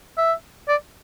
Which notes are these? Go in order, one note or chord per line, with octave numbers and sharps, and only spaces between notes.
E5
D5